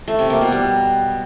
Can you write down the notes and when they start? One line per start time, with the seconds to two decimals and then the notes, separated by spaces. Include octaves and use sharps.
0.08 A3
0.19 C3
0.30 A#3
0.41 B2
0.52 G3